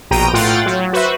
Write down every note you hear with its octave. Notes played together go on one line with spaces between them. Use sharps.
A#1 B2 G5 A#5 D#7
A2 F4 F#5 G5 C6 A6
F#3
F#4 B4 C5 E5